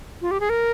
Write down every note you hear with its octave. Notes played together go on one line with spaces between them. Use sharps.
F4
G4
G#4
A#4